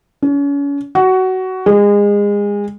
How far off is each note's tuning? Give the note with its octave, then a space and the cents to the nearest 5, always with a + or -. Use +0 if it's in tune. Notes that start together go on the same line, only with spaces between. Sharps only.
C#4 +35
F#4 +15
G#3 -25